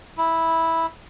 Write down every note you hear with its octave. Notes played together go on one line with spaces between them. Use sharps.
E4